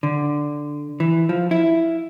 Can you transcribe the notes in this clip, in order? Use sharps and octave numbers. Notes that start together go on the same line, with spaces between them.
D3
E3
F3
E4